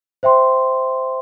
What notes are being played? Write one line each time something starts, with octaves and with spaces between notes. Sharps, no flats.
C5 E5 G5 C6